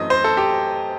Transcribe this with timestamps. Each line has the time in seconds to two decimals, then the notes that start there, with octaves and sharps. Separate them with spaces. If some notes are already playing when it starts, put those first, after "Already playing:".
Already playing: F#2 E3 A3 C4 D#5
0.10 C5
0.24 A4
0.37 G4